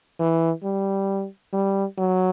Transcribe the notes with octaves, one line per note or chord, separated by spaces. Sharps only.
E3
G3
G3
F#3